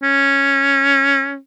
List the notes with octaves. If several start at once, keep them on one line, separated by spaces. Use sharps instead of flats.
C#4